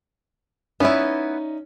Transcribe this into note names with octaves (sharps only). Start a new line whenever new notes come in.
B3 C#4 D#4 E4 D5 E5